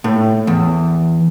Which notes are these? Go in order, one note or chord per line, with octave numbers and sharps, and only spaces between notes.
A2
E2